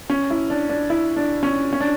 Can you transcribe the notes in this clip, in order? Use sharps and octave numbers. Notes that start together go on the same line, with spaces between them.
C#4
E4
D4
D4
E4
D4
C#4
C#4
D4